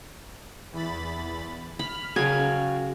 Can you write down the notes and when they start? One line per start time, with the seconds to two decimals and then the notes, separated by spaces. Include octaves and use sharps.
0.72 E2 B5 A6
1.79 B5 F6
2.16 C#3 F#3 F#4 F5 G5 G#5